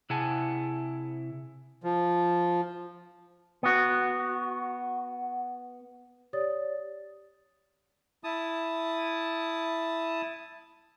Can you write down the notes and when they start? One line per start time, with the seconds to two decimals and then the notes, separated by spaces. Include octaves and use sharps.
0.10 C3 E4 G#4 F#5 G#5 A5
1.83 F3
3.63 B3 F#4
6.33 G4 C#5 D5 D#6 A6
8.24 E4 A5 D#6